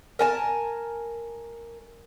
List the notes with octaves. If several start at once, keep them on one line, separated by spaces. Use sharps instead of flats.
A#4 G#5 A5